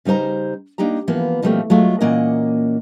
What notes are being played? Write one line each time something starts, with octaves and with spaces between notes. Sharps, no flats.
C#3 G3 D#4 C5 A#5
A#3 D4 D#4 G4 A#5
E3 F3 A#3 B3
B2 F3 G3 A3 A#3 C4
F#3 G#3 A3 F4
A#2 E3 A#3 C#4 D#5 F#5